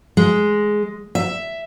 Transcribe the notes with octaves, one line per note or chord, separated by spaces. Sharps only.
G#3
E5